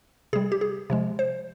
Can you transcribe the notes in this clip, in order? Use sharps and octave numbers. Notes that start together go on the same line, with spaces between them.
C3 G3 G#4
G4
G#4
C3 F3 G#3
C5